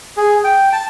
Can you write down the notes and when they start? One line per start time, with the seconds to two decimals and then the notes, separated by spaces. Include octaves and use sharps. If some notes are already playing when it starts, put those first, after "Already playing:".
0.17 G#4
0.44 G5
0.73 A5